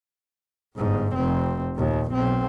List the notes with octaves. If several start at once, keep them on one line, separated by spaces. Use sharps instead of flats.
G1 G#2
F1 C4
D#2 A#2
B1 C4